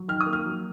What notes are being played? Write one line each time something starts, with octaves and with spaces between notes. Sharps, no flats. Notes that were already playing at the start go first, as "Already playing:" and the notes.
Already playing: F#3
D#3 F6
D#6
A#3
F6
F#3